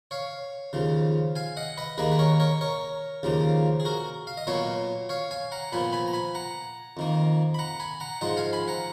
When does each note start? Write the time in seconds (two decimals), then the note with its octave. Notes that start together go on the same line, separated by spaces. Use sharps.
0.11 C#5 F5
0.73 D#2 C#3 F3
1.35 F5 G#5
1.57 D#5 F#5
1.77 B4 D#5
1.98 D#2 D#3 A#3 G#4 B4
2.12 B4
2.19 A#4 C#5
2.40 A#4 C#5
2.61 A#4 C#5
3.23 D#2 C#3 F3 A#3
3.80 G#4
3.85 F#4 A#4
4.27 F5
4.37 D#5
4.47 A#2 F#3 B3 C#5 F5
5.09 C#5 F5
5.31 F5 G#5
5.52 F#5 A#5
5.72 A#2 F3 B3 G#5 B5
5.93 G#5 B5
6.08 A#5
6.13 G#5 B5
6.35 F#5 A#5
6.97 F2 D#3 A#3
7.54 B5
7.59 F#5 A#5
7.80 G#5 B5
8.00 F#5 A#5
8.21 G#2 F3 G#3 D#5 F#5
8.37 F5 G#5
8.53 G#5 B5
8.68 F#5 A#5